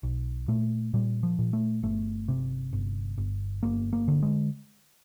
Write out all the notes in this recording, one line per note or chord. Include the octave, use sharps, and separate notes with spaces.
B1
A#2 A3
A#2 G3
F3
A#2
A3
G1 A3
C3
G1
G1
G1 A#3
A#3
D3
G#3